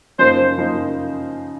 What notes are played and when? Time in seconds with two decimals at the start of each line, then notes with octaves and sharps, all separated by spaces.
0.19 F#2 C#3 F3 A#3 D#4 C5
0.58 C#3 F3 A#3 D#4